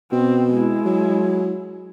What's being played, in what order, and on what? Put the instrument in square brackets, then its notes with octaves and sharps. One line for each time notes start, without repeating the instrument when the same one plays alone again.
[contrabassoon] B2 [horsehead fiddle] C4
[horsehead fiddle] G#3 E4
[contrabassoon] F#3